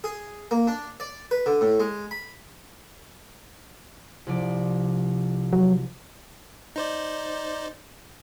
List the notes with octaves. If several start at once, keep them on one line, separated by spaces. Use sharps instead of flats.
G#4
A#3
D4
D5
B4
D3
A2
G#3
B5
C2 F3 D5
F#3
D#4 C5 D5